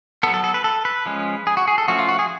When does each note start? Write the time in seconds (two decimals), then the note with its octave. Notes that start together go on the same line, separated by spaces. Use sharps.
0.23 B3 A4
0.27 F#3
0.34 A4
0.44 A4
0.54 B4
0.64 A4
0.85 B4
1.06 F3 G#3 C#4
1.47 G#4
1.57 F#4
1.68 G#4
1.78 A4
1.88 F3 A3 C#4 F#4
1.99 F4
2.08 F#4
2.19 G#4